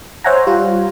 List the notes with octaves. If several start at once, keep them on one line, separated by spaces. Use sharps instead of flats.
C5 C#5 E5 F#5 G#5 A#5
G3 F4